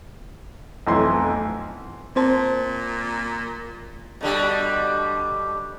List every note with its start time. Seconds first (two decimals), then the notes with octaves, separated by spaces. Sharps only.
0.87 B1 F2 E3 A3 E4 C6
2.16 A#2 C4 C5 A5
4.21 B2 D3 G3